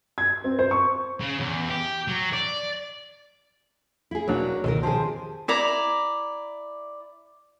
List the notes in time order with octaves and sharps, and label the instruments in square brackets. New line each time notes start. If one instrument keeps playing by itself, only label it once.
[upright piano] G#6
C4
C5
C#6
[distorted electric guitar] C#3
E2
G4
F#3
D5
[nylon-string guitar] E4 G#4
[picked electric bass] E1 D4 [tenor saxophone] F#3 [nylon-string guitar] A#3
[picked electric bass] C#2 B2 D3 [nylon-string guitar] D#3 D#4 A#4
[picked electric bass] B2 D#3 F3 [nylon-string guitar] G4 G#4 [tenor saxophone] C5 [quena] A5
[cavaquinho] E4 D5 A#5